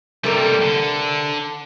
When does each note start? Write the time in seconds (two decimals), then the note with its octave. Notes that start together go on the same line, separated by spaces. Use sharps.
0.24 C3 G3 A#3 A4 A#4
0.62 D3